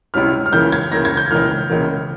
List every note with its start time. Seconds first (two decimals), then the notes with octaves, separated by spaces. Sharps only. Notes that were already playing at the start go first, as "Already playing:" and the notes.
0.14 C#2 C3 G3 C#4 E4 F6
0.46 F6
0.52 C#2 C#3 E3 A#3 G6
0.72 G#6
0.91 C#2 C#3 E3 A#3 A#6
1.05 G#6
1.17 G6
1.31 C#2 C#3 E3 A#3 F6
1.70 C#2 C#3 E3 A#3